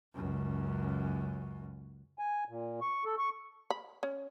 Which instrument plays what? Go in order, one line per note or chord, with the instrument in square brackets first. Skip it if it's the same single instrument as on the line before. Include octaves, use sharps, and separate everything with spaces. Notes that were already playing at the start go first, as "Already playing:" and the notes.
[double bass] C#2 F#2
[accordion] G#5
A#2
C#6
A4
C#6
[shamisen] B5
C#4